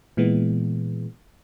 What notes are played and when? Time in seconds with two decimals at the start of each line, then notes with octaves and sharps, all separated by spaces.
0.17 A#2 E3 G#3 B3